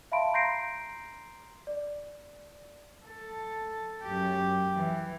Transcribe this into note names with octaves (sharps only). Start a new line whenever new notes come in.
E5 F5 A5 B5 C6 D7
A#5 C6 G6 A#6 C7 D7
D5
A4
F#2 G4
E3